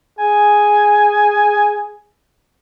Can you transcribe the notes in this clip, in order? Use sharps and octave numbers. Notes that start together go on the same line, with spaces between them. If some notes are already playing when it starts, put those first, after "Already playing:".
G#4 G#5